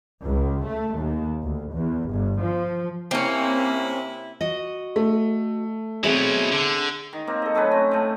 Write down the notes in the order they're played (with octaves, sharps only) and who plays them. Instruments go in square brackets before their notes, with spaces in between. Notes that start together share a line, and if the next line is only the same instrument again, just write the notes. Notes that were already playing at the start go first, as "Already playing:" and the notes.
[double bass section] C#2
A3
D#2
D2
E2
G1
F3
[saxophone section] C3 E4 [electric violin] A#3 [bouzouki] C4 C#4
[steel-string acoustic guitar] F#4 D#5
[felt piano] A3
[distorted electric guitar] B2 F#3 [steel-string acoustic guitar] C4 G#4 E5
[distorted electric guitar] D3
[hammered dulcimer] D#3
A#3 C4
A4 D#5
F#3 A3 C#4 B4
C4
A2 A3